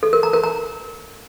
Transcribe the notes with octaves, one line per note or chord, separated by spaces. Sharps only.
A4
A#4
A#5
A#4
A#5